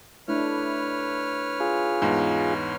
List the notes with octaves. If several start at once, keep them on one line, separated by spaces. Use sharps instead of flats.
A3 D4 E4 B4 C#5 F6
F4 G#4
E2 G#2